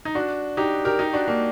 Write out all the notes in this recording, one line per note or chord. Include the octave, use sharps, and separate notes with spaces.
D#4
D4 F#4
D#4 G4
G4 A#4
D#4 G4
D4 F#4
A#3 D4